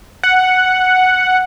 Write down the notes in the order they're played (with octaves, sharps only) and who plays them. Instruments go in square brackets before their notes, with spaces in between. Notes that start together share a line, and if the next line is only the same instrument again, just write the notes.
[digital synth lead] F#5